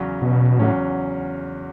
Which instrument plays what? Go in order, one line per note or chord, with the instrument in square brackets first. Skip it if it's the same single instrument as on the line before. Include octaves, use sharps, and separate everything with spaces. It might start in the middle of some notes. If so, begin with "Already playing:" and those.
Already playing: [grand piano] E2 C#3 F#3 C#4
[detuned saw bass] B2
[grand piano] E2 C#3 F#3 C#4 [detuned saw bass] A2